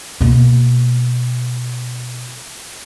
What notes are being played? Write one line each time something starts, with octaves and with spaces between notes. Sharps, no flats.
B2 A#3